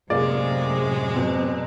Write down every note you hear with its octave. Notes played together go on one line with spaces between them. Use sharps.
F#2 A2 C3 G#3 A#3 G#4 D5
B2 F#3 C4